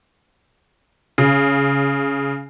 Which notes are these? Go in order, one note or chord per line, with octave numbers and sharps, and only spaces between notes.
C#3